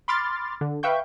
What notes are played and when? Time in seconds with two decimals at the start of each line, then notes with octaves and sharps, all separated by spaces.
0.08 B5 C6 D6 F6 A6
0.61 D3
0.83 B4 E5 F5 G5 C#6 G6